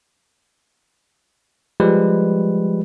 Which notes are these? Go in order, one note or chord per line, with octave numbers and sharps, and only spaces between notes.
F3 G3 G#3 G4 B4